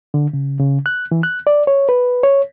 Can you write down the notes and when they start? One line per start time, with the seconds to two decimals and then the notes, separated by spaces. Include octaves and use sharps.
0.14 D3
0.34 C#3
0.60 C#3
0.86 F#6
1.12 E3
1.23 F#6
1.47 D5
1.67 C#5
1.89 B4
2.23 C#5